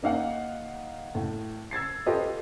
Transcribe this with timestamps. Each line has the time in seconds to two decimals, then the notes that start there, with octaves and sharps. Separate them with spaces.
0.02 A#3 D#4 F5 F#5
1.15 A2
1.71 E6 G#6 A6 C7
2.06 F4 G4 A4 B4 D#5